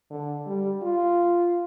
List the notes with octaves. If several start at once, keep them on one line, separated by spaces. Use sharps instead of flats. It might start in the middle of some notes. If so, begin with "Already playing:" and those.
D3
G3
F4